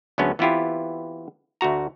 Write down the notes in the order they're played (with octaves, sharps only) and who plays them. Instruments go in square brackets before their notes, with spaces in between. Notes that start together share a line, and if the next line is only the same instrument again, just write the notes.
[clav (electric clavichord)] D2 F#3 G#3 B3 C#4 D4
E3 B3 C4 E4 F4 G4
D2 A3 F#4 A#5